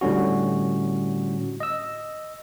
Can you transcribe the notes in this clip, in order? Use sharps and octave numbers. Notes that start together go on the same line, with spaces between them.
A2 D3 G3 C#4 F#4
D#5 E6